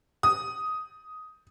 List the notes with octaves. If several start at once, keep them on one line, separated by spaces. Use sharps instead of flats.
D#6